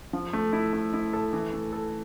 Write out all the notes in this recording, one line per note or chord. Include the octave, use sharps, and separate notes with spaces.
F3
A3
E4
A3
E4
A4
E3
A3
A4